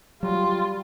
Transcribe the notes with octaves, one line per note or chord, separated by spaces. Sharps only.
F#3 G3 F4